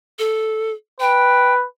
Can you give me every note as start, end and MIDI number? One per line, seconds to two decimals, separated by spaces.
0.19 0.72 69
1.00 1.65 71
1.00 1.54 79